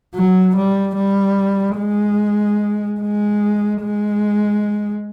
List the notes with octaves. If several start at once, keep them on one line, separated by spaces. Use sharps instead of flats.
F#3
G3
G3
G#3
G#3
G#3